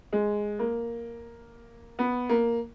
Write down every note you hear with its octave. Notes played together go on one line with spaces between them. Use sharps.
G#3
A#3
B3
A#3